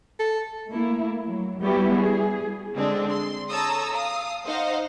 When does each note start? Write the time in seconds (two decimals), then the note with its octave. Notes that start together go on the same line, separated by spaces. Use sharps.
0.19 A4
0.69 A3 A#3 E4
1.25 F#3
1.62 G3 B3 E4 F#4 G4
1.98 G#4
2.76 D3 G#3 C4 D4
3.11 C6
3.51 A4 C#5 A5 A#5 D#6 E6
3.93 F5 D#6
4.45 D#4 C5 D#5 F5 F#5